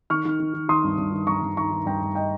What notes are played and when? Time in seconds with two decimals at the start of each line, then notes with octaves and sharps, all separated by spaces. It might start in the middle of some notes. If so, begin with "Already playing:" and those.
0.10 D#3 C#6 F6
0.25 D#3
0.40 D#3
0.54 D#3
0.69 D#3 C6 D#6
0.84 G2
0.98 G2
1.12 D#3
1.27 G2 A#5 C#6
1.42 G2
1.57 D#3 A#5 C#6
1.71 D#3
1.86 G2 G5 A#5
2.01 G2
2.15 D#5 G5